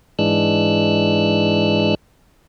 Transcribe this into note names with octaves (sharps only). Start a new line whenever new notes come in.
G#2 E3 G#3 D4 E6 F#6